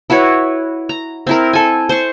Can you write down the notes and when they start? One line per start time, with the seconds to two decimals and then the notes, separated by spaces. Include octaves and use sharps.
0.10 E4 F#4 B4 C#5
0.89 A#5
1.27 C4 E4 A#4
1.53 A4 G#5
1.89 C5 C#6